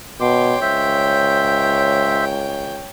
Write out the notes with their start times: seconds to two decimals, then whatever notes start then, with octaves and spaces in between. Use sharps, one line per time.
0.20 B2 C#5 G5 C6 D6
0.61 C#2 C5 E5